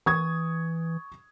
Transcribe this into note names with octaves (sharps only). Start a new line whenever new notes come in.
E3 C#6 D#6 G#6